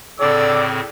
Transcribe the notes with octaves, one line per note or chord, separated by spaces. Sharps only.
A2 C#3 C4 A4 D5 D6 E6